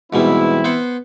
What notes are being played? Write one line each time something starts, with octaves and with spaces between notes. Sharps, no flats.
G#2 B2 E3 G3 C4 E4
B3 C5 F#5